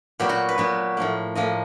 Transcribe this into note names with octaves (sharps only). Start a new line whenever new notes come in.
A#2 F#3 B3 G4
F#4
B4
A#2 F#3 B3
A2 F3 A#3
A2 F3 A#3 D#5